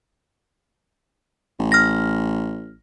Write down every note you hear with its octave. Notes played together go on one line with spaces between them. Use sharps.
A1
F6 A#6